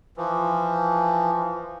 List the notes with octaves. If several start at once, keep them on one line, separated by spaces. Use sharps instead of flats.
E3 F3